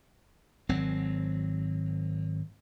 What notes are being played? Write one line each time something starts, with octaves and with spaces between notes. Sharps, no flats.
G#1 F#3 C4